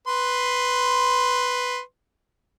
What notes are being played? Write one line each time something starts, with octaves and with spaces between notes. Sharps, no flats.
B4 C6